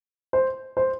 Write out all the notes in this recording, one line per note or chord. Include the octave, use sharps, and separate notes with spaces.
C5
C5